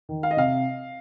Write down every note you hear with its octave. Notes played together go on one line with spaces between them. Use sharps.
D#3
F5
D#5
C3 F5